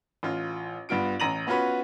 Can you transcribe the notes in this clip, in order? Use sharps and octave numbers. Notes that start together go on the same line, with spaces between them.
A1 F4
G2 B3 F4 D7
A1 A#5 A#6 D#7 F#7
B3 C#4 F4 F#4 B4